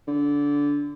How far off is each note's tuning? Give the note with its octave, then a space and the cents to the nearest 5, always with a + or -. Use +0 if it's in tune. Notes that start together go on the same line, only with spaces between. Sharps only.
D3 -20